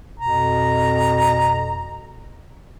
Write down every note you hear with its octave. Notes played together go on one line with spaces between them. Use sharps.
F2 B2 A#5